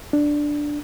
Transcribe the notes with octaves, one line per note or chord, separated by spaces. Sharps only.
D4